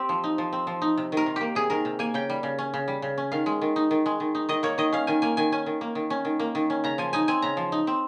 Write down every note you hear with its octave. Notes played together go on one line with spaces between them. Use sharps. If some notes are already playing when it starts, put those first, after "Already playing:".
Already playing: C4 G4
F3
D#4
F3
C4
F3
D#4
C3
D#3 A#4
C3
A#3 G4
C3 G#4
D#3 A#4
C3
A#3 G#5
C#3 G5
G3
C#3
C#4
C#3
G3
C#3
C#4
D#3 F5
G#3
D#3
D#4
D#3
G#3
D#3
D#4
D#3 D#5
A#3 C#5
D#3 D#5
C#4 F5
D#3 G#5
A#3 G#5
D#3 G#5
C#4 G#5
D#3
A#3
D#3
C#4
D#3
A#3
D#3
C#4
C#3 A#5
F3 G#5
D#4 G#5
C4 G#5
C#3 A#5
F3
D#4
C4